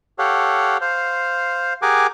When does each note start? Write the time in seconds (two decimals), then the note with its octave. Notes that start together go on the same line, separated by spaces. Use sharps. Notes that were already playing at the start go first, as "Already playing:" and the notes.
0.19 G4 A4 C#5 F5 F#5
0.81 C5 F5
1.82 G4 G#4 A#4 F#5 G#5 D6